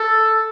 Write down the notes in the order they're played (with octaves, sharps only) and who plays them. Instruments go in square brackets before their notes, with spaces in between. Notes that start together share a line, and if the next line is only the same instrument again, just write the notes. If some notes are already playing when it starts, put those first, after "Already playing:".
Already playing: [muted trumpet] A4